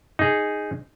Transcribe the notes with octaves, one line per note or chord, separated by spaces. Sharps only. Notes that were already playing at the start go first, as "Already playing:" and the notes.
D#4 G#4